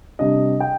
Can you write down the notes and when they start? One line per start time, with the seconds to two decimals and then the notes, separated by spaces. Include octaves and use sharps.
0.19 C3 G3 D4 D#5
0.60 G5